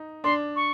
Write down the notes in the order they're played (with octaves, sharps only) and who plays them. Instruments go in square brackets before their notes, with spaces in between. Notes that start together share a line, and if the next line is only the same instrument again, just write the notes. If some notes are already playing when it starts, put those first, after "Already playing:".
Already playing: [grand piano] D#4
[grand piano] D4 [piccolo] C6
[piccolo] C#6